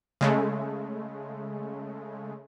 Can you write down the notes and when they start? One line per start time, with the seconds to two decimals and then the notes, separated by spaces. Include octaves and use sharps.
0.21 C#3 G#3 A3